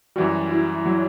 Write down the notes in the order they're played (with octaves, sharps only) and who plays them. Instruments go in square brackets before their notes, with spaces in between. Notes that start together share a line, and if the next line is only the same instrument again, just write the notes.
[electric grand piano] F#2 E3 G3 [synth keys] F#4
[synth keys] E4
F#3